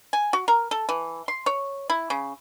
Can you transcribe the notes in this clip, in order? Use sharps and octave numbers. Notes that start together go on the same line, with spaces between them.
G#5
F#4
A#4
A4
E3
C6
C#5
E4
C#3